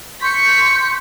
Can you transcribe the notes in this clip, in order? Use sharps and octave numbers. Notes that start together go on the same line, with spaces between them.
C6 C#6 G6 B6 C#7